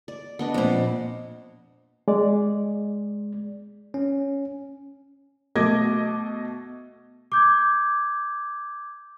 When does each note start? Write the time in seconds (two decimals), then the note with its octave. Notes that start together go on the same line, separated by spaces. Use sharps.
0.08 D5
0.39 B3 D4 D#5
0.54 F2 A#2
2.08 G#3 D5
3.94 C#4
5.55 B2 A3 D#5 D6 G#6 A#6
7.32 D6 G6 G#6